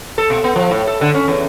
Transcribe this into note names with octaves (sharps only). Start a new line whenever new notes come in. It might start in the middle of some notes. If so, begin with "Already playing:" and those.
A4
B2
B3
F3
A2
A4
D3
C#4
E2